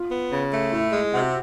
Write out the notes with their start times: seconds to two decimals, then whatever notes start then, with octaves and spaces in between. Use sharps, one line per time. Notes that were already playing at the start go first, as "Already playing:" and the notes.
Already playing: F4
0.11 B3
0.32 C#3
0.51 A3
0.72 A2 E4
0.92 G#3
1.13 C3 F#4